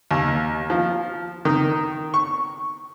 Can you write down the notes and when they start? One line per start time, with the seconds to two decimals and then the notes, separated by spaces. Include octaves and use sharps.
0.11 D#2
0.70 F3
1.45 D#3
2.14 C#6